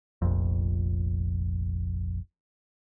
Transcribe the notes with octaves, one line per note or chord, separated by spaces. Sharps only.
F1 A#1 F2